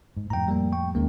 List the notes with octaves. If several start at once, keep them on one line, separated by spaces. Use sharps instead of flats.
G#2
F2 A2 G5 A#5
G3 A#3
G5 C#6
D#2 D#3 G#3 A#3 C4 C#4